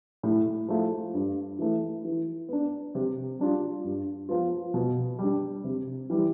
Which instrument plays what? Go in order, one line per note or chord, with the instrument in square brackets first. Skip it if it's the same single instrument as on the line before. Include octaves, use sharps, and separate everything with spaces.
[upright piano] A2
F3 A3 E4
G2
E3 A3
E3
B3 D4
C3
G3 D4 F4
G2
F3 B3 F4
B2
G3 D4
C3
E3 G3